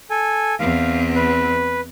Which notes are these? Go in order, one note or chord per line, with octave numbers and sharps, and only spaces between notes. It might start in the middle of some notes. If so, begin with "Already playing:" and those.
A4 G#5
E2 C4 F5
B4